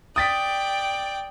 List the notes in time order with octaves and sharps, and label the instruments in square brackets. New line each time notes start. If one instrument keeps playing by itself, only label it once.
[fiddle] D5 G5 [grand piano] D#6 A6 B6